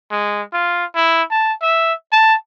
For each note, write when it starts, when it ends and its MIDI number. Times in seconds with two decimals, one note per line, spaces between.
0.11 0.42 56
0.53 0.85 65
0.95 1.23 64
1.31 1.53 81
1.62 1.93 76
2.12 2.34 81